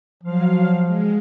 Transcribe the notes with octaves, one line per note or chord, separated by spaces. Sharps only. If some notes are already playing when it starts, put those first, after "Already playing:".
F3 F#3 F5
G#3